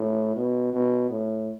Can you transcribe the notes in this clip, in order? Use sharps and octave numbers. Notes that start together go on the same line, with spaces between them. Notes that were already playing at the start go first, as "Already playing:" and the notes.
Already playing: A2
B2
B2
A2